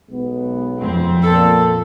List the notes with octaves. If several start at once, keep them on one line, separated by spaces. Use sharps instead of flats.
B1 G#3 B3
F2 C4
A#2 A4